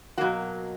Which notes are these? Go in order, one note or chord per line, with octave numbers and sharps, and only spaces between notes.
B2 F#3 A#3 F#4